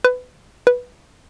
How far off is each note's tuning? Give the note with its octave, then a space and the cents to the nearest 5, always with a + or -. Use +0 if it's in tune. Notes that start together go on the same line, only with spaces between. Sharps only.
B4 +25
B4 -5